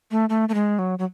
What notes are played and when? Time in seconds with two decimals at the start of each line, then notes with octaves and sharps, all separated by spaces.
0.11 A3
0.29 A3
0.49 A3
0.54 G#3
0.79 F#3
0.99 F#3